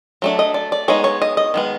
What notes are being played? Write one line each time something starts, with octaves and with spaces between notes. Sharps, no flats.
F#3 A3 D4
D#5
D5
D5
G#3 B3 D#4 C#5
C#5
D#5
D#5
D#3 G#3 B3